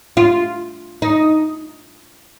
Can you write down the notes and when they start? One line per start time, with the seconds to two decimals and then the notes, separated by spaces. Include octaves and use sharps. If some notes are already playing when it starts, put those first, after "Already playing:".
0.17 F4
1.02 D#4